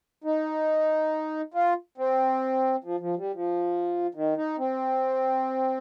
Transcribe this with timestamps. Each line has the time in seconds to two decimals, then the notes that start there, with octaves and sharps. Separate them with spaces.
0.24 D#4
1.54 F4
1.98 C4
2.84 F3
3.00 F3
3.17 G3
3.34 F3
4.15 D#3
4.37 D#4
4.58 C4